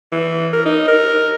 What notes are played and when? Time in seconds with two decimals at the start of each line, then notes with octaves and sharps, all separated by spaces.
0.12 E3
0.53 A#4
0.65 D#4
0.88 A#4